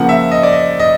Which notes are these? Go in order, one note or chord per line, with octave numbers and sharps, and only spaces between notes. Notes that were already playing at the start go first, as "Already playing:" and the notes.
Already playing: C#3 F3 A#3 F#5
E5
D#5
D5
D#5
D#5